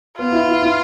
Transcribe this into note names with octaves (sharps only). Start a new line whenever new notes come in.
B3 F4
E4
E4
E4